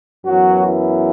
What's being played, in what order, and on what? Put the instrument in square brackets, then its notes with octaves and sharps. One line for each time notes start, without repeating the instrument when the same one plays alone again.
[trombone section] F#2 E3 F#3 B3 F#4
E4